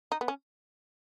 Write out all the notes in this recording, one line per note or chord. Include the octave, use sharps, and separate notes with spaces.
D#4
B3
C#4